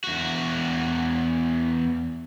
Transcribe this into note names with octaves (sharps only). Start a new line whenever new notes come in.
E2 F#4